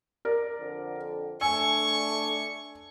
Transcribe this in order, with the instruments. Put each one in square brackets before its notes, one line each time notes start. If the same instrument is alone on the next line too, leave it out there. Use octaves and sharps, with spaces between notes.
[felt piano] A#4 D5
[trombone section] F2 D3
[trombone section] A3 D4 [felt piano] G#5 E6 [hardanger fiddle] C#6